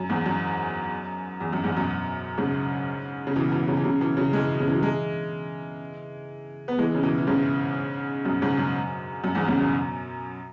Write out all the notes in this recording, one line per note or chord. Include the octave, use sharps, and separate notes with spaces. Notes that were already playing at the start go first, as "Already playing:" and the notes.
Already playing: F#2
E2 G#2
F#2
E2
F#2
E2 G#2
F#2 B2
G#2 C#3
C#3
B2 E3
B2 E3
C#3 F#3
E3
C#3 F#3
B2 E3
C#3 F#3
E3 G#3
B2
C#3
E3
F#3
E3 G#3
B3
E3 G#3
C#3
B2 E3
E3
G#2 C#3
F#2 B2
G#2 C#3
F#2
F#2
E2 G#2
G#2 C#3
F#2 B2